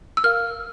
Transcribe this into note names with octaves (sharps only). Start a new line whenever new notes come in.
E6
A#4 F5 F6